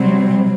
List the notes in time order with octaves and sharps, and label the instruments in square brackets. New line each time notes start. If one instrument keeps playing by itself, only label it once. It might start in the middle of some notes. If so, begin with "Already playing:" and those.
Already playing: [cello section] C3 F#3 C4 [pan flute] G3